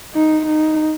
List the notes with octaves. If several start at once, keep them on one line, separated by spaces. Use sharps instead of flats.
D#4
D#4